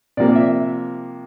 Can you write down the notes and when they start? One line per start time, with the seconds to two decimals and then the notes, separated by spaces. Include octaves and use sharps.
0.17 C3 F3 A#3 D5
0.35 E5